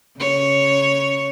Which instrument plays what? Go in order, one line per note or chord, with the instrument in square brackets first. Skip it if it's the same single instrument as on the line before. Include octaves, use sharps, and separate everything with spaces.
[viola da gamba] C#3 C#5